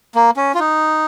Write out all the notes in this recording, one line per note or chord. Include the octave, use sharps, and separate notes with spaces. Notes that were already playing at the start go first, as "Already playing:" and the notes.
A#3
C#4
F4
D#4